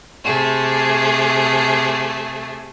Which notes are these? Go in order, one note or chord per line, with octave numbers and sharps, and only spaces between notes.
C3 A3 G#4